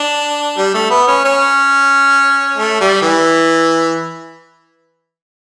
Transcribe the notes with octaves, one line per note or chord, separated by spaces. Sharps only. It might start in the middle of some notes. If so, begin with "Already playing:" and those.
Already playing: D4
G3
A3
B3
C#4
C#4
A3
G3
E3